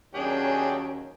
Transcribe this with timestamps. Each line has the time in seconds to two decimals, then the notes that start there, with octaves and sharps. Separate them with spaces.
0.15 D#2 F#3 C#4 D4 G#4 G5